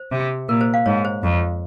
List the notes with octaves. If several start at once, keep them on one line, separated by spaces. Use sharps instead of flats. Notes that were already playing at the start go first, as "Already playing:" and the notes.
Already playing: C5
C3
A#2 A#4
C5
F5
G#2 C#5
C5
F2